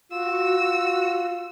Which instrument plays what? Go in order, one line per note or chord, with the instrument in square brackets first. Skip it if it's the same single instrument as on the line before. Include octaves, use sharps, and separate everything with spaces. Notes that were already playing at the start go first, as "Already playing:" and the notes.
[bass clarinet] F4 [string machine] F#4 [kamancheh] E6